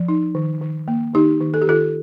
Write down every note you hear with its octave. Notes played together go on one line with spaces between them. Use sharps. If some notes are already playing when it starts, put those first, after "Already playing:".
Already playing: F3
D#4
D#3
D#3
A#3
D#3 D#4 G4
D#3
A4
G4
D#3 F4 A4